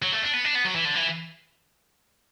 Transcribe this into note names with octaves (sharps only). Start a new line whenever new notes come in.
F#3
A3
D4
B3
D4
B3
F#3
E3
D3
E3